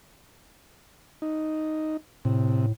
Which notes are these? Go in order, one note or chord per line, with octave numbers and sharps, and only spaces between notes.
D#4
A2 C3